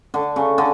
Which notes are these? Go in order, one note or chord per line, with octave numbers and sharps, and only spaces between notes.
D3
C#3
D3